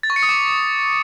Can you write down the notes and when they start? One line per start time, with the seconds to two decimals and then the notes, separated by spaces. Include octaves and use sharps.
0.03 A6
0.10 C#6
0.16 C#7
0.23 D#6
0.29 D6